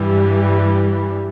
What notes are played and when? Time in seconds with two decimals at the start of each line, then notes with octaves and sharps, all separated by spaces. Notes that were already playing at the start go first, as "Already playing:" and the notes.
Already playing: G2 E3 G3